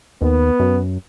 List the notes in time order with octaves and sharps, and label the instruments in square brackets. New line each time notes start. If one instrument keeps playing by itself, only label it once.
[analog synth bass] D#2 [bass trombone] B3
[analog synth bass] F#2